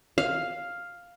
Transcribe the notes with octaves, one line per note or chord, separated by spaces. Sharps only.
F5